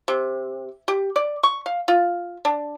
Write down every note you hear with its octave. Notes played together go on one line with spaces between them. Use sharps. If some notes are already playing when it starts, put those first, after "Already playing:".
C3
G4
D5
C#6
F5
F4
D4